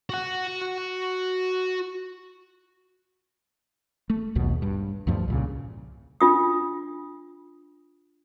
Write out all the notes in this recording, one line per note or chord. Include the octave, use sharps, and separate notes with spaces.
F#4 F#5
A3
A#1 D#2 B2
G2
D2 G2 F3
C2 A#2 C#3
D4 F4 D#6